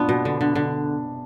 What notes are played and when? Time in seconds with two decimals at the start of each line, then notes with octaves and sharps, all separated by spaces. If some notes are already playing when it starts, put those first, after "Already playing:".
Already playing: B3 D4 F4
0.09 B2
0.25 D3
0.41 D3
0.55 D3